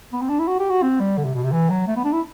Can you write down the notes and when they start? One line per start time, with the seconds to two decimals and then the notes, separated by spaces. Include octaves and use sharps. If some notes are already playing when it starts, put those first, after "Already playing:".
0.13 B3
0.21 C4
0.29 D4
0.39 E4
0.48 F#4
0.60 G4
0.70 F#4
0.83 C4
1.00 G3
1.17 D3
1.25 C3
1.35 B2
1.44 C3
1.52 E3
1.70 F#3
1.87 A3
1.96 B3
2.04 D4
2.13 E4